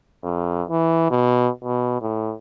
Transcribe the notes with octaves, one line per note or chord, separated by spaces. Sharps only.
F2
E3
B2
B2
A2